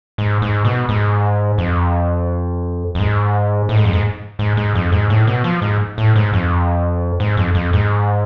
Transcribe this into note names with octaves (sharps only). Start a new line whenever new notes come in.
G#2
G#2
B2
G#2
F2
F2
G#2
A2
G#2
F2
G#2
G#2
G#2
F2
G#2
A2
B2
F3
G#2
A2
G#2
F2
G#2
F2
F2
G#2